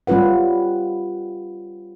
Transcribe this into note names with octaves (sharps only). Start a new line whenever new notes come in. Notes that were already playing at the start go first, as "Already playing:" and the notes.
G3 C#4 F4 B4 F#5